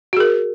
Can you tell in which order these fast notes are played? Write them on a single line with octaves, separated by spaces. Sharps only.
F#4 G#4 A#4